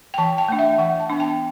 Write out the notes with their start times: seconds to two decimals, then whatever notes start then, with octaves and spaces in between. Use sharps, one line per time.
0.14 G5
0.18 E3 A5
0.38 G5
0.48 A3 D4
0.59 E5
0.79 E3 F#5
1.00 A5
1.10 B3 D4
1.20 G5